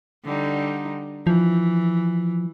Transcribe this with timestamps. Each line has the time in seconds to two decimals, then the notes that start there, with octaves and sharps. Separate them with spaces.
0.24 D3 G3 D#4
1.27 E3 F3